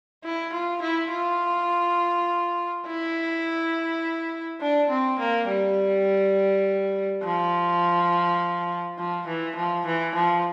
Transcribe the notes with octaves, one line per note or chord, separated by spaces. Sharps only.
E4
F4
E4
F4
E4
D4
C4
A#3
G3
F3
F3
E3
F3
E3
F3